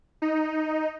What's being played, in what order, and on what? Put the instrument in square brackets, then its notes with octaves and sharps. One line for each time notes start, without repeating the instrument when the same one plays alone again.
[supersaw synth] D#4